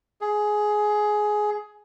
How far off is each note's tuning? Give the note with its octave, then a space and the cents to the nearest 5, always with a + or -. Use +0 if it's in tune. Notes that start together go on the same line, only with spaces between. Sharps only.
G#4 +15